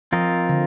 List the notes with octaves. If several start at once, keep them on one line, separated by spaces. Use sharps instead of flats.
F3 C4 F4 A#4 D#5
D3